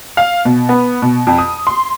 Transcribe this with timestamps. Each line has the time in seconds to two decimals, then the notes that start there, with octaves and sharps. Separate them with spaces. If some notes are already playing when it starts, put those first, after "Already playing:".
0.17 F5
0.45 B2
0.69 B3
1.02 B2
1.27 F2
1.38 D#6
1.67 C6